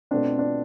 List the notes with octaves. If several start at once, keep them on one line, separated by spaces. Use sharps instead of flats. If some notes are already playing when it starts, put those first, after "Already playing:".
B2 A3 C4 D4
D4